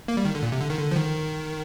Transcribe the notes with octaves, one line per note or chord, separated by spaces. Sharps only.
A#3
G3
D#3
D3
A#2
C3
D3
D#3
D3
F3
D#3